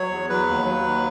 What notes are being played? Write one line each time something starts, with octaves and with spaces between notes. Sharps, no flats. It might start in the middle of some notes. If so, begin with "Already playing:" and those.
Already playing: F#3 C#5
E2
F#3 B4
D#2
F#3
D#2